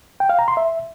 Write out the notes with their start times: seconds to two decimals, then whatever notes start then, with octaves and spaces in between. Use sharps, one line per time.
0.20 G5
0.29 F5
0.39 A#5
0.48 C6
0.57 E5